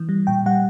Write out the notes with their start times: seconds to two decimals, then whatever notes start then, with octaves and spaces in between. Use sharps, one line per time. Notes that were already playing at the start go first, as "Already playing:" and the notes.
Already playing: E3
0.09 G3
0.27 A#2 G5
0.46 G3 F#5